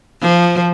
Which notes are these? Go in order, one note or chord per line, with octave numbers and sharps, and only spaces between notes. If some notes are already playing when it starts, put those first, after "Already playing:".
F3